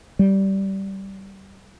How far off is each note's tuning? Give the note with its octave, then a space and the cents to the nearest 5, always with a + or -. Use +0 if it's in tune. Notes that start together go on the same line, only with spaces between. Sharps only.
G3 -15